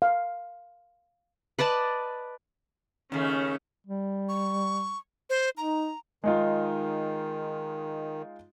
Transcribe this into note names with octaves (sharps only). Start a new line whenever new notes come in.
F5
B4 D5 D#5 A5
D#2 C#3 A3 C#4
G3
C#6
C5
D#4 A#5
D#3 G#3 D#4 F4